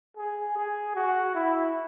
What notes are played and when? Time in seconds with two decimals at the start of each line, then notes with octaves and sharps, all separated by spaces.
0.17 G#4
0.57 G#4
0.95 F#4
1.35 E4